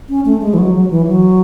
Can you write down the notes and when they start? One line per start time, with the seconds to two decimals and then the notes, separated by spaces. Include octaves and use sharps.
0.09 C#4
0.26 A3
0.42 G#3
0.54 E3
0.58 F#3
0.74 F#3
0.91 E3
1.07 F#3